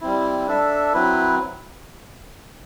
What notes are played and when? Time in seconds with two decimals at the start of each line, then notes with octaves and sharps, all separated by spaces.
0.01 G3 C4 E4
0.47 D4 A4 E5
0.93 F#3 C4 E4 B4